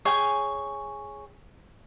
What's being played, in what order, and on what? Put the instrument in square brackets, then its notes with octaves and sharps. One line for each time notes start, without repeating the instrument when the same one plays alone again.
[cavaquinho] G#4 C#5 G5 G#5